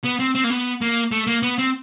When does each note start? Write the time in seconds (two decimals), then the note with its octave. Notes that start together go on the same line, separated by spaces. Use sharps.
0.04 B3
0.19 C4
0.35 C4
0.44 A#3
0.50 B3
0.81 A#3
1.12 A3
1.27 A#3
1.43 B3
1.58 C4